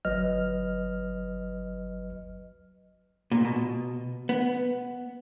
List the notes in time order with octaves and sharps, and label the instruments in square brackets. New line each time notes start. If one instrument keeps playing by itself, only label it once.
[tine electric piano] G1 F#3 B4 D#5 F6
[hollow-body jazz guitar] A#2
B2
B3